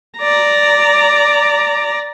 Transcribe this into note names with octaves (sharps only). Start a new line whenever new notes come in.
D5 A#5